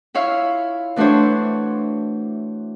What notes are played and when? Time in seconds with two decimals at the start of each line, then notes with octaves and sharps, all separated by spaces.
0.14 E4 F4 C#5 E5 F5
0.96 E3 A3 D4 F#4 C5 C#5